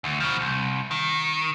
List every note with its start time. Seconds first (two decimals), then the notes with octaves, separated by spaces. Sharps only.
0.04 D2
0.20 B2 F3
0.41 C2
0.91 D#3